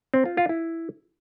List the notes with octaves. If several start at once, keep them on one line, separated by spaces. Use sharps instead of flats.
C4
F4
F4
E4